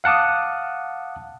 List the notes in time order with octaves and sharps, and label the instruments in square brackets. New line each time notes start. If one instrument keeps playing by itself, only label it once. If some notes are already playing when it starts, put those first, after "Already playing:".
[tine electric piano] F5 F#5 A5 D6 D#6